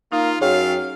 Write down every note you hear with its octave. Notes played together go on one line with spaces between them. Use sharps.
A#3 D#4 F4
F#2 G#4 C#5 F5 G5